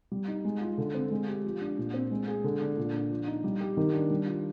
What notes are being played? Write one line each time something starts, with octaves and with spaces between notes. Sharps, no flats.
G3
D#4
G#3
F4
D3
C4
G#3
G4
F3
D4
A#2
C4
G#3
G#4
D3
D4
A#2
D4
F3
D#4
G3
G4
D#3
D4
G3
F4